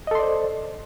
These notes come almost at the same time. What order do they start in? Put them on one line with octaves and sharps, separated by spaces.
D#5 A4 C6 D5 C5